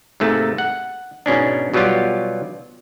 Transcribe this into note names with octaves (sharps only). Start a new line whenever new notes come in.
G#2 C3 A3 A#3 A5
F#5
G#2 B2 C#4 D4
B2 F#3 G3 B3 F4 G4